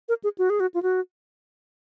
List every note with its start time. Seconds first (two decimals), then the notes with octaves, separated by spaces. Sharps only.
0.09 A#4
0.24 G#4
0.38 F#4
0.50 G#4
0.60 F#4
0.74 F4
0.83 F#4